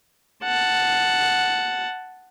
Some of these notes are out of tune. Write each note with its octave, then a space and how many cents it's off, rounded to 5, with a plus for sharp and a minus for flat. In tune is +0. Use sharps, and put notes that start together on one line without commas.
F#5 +0 A5 +0